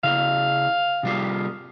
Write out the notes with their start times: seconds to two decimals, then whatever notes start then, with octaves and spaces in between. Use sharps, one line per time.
0.04 C#3 E4 F5
1.03 C3 G3 F4